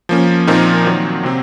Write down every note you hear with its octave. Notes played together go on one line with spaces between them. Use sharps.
F3 A#3 C#4
A#2 F3 C4 D#4 A#4
D#3 F#3 A#3
C3 F#3 C4